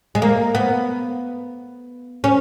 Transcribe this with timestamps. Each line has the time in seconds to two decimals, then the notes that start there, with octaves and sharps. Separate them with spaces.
0.15 G#3
0.22 A#3
0.55 B3
2.24 C#4